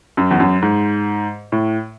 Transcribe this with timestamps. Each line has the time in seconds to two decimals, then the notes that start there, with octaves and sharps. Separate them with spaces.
0.17 F#2
0.31 E2
0.40 F#2
0.62 G#2
1.52 A2